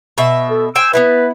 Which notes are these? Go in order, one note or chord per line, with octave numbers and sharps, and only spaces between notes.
B2 E5
A4
C5 G5 G#5 E6
B3 C4 E4 B4